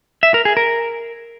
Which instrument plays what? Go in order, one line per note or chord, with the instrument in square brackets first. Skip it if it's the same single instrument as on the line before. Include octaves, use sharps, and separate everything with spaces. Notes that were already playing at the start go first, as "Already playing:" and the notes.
[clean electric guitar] E5
A#4
G#4
A#4